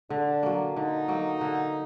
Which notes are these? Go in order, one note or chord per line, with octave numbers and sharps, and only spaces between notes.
D3 D4
F#3 A#3
D3 D#4
F#3 A#3
D3